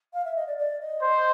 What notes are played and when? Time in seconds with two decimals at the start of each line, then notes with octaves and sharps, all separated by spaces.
0.13 F5
0.24 E5
0.35 D#5
0.46 D5
0.57 D5
0.80 D#5
1.02 C5